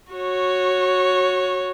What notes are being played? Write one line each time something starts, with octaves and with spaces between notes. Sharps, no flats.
F#4 C#5